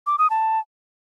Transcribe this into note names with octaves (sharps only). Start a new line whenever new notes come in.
D6
D#6
A5